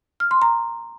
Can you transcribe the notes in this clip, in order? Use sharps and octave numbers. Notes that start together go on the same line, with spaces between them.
F6
C6
A#5